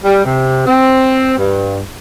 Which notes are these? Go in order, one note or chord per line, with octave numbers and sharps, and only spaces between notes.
G3
C3
C4
G2